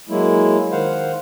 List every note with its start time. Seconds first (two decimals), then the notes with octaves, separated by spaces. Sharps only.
0.09 F#3 G#3 A#3 E4
0.72 D#3 C5 F5 F#5